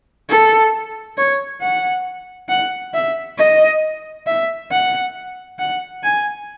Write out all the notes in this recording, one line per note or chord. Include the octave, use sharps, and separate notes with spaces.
A4
C#5
F#5
F#5
E5
D#5
E5
F#5
F#5
G#5